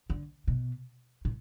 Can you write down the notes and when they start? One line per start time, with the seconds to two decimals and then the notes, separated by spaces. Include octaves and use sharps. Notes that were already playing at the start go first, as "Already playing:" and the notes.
0.10 D3
0.47 B2
1.25 A2